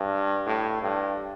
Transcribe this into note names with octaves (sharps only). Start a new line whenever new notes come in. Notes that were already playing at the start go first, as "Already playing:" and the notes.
Already playing: G2
A2
G2